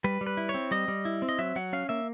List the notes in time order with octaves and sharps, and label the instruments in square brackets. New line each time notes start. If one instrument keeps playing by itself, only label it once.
[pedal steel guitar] G3 B4
G3
B4
E4
C#5
C4
G3 D#5
G3
E4
C4
D#5
F#3 E5
F#3 F#5
C#4 F5
A#3 E5